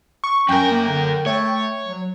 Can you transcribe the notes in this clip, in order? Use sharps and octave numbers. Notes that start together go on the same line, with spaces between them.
C#6
F#2 C#4 A#4 G5
A#3
D3
A3 C#5
F#3